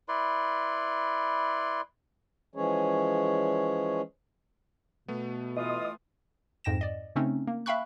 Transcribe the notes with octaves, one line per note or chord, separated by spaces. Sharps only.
E4 B4 D5 C6
E3 F3 G#3 C#4 G#4 C#5
B2 A3 B3
E3 F4 D#5 D#6
F2 G#2 G5 A#6 E7
D5 D#5
C#3 A3 C4 C#4 D#4
A#3
E5 F5 G5 B5 C#6 F#6